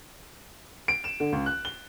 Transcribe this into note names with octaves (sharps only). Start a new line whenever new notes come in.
D7
E7
D3
C#2
F#6
G7